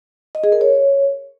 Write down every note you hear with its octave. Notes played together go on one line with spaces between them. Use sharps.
D#5
G#4
A#4
C#5